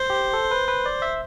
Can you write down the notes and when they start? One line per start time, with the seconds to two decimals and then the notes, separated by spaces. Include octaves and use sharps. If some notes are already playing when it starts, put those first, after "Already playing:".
Already playing: C5
0.10 G4
0.33 A4
0.51 B4
0.68 B4
0.86 D5
1.02 E5